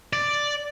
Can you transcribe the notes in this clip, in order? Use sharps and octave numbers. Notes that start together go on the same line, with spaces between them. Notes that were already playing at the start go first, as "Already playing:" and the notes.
D5